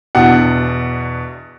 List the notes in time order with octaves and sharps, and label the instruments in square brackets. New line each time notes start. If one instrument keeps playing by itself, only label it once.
[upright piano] E2 B2 D4 F#5